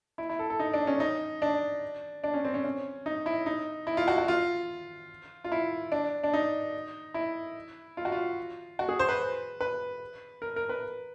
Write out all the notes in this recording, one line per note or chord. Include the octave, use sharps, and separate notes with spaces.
E4
E4
A4
A4
D#4
D4
C#4
D#4
D4
D4
C#4
C4
C#4
C#4
D#4
E4
D#4
E4
F4
F#4
F#4
F4
F4
E4
D4
D4
D#4
E4
F4
F#4
F4
F#4
G#4
C5
B4
B4
A#4
A#4
B4